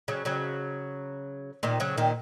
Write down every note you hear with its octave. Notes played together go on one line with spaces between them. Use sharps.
C#3 F#3
C#3 F#3
A#2 D#3
C#3 F#3
A#2 D#3